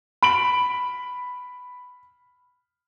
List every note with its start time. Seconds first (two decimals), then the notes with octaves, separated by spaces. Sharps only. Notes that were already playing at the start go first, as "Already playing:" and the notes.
0.23 B5 D7 F#7